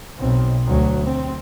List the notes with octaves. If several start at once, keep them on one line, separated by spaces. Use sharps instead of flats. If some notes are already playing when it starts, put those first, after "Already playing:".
B1 C4
D2 F#3
C4